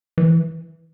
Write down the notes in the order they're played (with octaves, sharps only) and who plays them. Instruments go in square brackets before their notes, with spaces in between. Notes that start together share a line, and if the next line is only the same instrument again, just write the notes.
[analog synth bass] E3